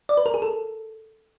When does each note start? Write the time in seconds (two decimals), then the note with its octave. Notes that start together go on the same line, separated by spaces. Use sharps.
0.09 D5
0.17 B4
0.26 A#4
0.34 G#4
0.42 A4